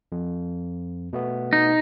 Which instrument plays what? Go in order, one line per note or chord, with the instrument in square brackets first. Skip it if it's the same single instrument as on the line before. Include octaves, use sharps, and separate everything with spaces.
[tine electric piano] F2
B2 A3 B3
[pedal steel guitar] D#4